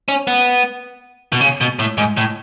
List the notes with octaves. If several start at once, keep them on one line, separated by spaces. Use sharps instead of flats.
C#4
B3
B2
C#3
B2
A2
G#2
A2